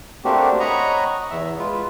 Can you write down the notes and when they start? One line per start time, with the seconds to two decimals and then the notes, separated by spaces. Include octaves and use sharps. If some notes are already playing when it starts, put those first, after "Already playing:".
0.25 A3 A#3 C4 D4 F#4 G4
0.60 C#5 D#5 F#5 A#5 B5 C#6
1.31 E2 E5
1.59 G#3 F4 B4